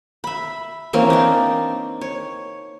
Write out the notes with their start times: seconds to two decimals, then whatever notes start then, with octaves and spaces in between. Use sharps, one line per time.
0.24 E5 B5
0.93 E3 A#3 C4 C#4
1.10 D4 D#4
2.01 C#5